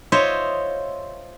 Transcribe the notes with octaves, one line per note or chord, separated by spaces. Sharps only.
F4 C5 C#5 D#5 E5